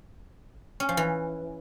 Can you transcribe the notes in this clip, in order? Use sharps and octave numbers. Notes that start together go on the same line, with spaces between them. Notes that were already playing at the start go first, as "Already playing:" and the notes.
C#4
F3
E3